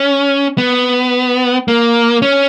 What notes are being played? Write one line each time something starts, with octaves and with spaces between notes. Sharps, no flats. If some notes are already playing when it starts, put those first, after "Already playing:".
Already playing: C#4
B3
A#3
C#4